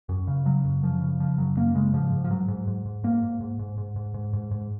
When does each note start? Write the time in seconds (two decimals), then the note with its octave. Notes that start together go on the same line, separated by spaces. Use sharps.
0.09 F#2
0.27 C#3
0.45 C#3 F#3
0.64 F#2
0.83 F#2 F3
1.01 C#3
1.20 C#3 F3
1.38 F#2 F#3
1.57 F#2 A#3
1.75 C#3 G#3
1.93 G#2 F3
2.12 G#2
2.24 F3
2.30 G#2 F#3
2.48 G#2
2.67 G#2
2.86 G#2
3.04 G#2 A#3
3.22 G#2
3.41 G#2
3.59 G#2
3.78 G#2
3.96 G#2
4.14 G#2
4.33 G#2
4.51 G#2